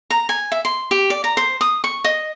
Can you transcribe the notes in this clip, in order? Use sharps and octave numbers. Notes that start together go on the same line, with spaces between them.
A#5
G#5
E5
C6
G4
D5
A#5
C5
D#6
C#6
D#5